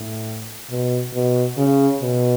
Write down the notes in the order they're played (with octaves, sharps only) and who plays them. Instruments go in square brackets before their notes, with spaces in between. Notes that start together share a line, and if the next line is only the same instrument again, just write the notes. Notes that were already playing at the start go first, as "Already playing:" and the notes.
Already playing: [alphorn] A2
B2
B2
C#3
B2